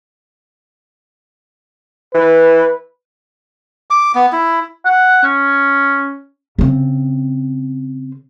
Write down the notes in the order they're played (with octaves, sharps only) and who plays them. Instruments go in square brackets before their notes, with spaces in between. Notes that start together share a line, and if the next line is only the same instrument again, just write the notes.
[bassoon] E3 [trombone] B4
[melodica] D6
B3
E4
[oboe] F#5
C#4
[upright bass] C#3 C4